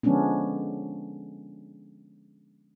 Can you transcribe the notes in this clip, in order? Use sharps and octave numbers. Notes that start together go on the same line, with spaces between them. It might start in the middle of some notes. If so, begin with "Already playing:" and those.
D3 F3 G#3 B3 C#4 D4